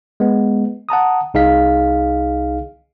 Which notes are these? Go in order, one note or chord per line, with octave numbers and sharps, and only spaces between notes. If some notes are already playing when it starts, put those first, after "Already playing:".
G#3 B3
F#5 A5 A#5 D#6
C2 D#4 G#4 F5 B6